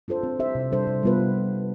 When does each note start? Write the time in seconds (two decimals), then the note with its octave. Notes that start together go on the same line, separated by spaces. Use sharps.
0.08 D4 F4 A4 C5
0.23 C4
0.40 G4 C5 E5
0.55 C3
0.72 G3 D4 A4 C5
0.87 C3
1.03 G3 B3 F4 B4